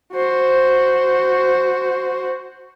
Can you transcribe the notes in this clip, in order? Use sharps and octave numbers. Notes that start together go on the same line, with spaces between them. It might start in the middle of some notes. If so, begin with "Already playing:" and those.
F#4 C5